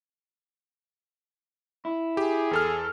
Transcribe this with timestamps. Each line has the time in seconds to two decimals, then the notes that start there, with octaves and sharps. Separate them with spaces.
1.85 E4
2.17 G4 G#4
2.51 E2 A4 F6